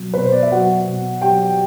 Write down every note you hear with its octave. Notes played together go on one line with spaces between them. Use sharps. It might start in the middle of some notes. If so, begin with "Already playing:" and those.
Already playing: B2 F#3
B2 B4
C5
D5
E5
F#3 F#4 F#5
B2
F#3 G4 G5